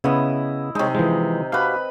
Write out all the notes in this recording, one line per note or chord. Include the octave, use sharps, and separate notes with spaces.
C#3 B3 C#4 E4 D#5
C3 G#3 D#4 C#5
E3 F3 G#3
F#4 G4 B4 F5 B5